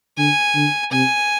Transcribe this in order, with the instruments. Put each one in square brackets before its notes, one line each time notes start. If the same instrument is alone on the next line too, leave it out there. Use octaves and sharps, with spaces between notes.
[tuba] D3 [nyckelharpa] G#5
[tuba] D3
[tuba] C3 [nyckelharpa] G#5